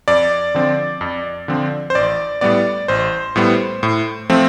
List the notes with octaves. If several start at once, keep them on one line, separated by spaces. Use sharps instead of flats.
F2 D5
D3 F3 C4
F2
D3 F3 C4
C5
A1 D5
A2 G3 B3 D5
A1 C5
A2 G3 B3
A2
F3 A3 C4